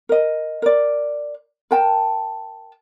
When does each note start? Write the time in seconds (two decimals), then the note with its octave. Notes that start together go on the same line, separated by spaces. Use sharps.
0.09 A#4 D#5
0.62 A#4 D5
1.71 A#4 G5 A5